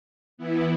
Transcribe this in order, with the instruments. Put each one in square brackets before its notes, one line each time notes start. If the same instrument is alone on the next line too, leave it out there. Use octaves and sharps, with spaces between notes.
[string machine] E3 B3 E4